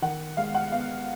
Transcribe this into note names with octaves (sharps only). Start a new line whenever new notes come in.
D#3 F#5
G#3 F5
F#5
B3 F5